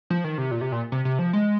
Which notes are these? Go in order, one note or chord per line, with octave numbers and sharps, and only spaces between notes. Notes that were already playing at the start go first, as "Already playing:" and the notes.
F3
D#3
C3
A#2
C3
A#2
C3
C3
F3
G#3